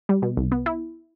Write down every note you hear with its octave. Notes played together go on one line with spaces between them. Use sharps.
G3
B2
C2
B3
E4